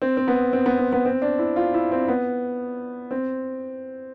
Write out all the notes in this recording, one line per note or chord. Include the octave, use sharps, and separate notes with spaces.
C4
C4
B3
C4
B3
C4
B3
C4
D4
E4
F4
E4
C4
B3
C4